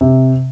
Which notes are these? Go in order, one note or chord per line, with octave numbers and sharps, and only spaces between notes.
C3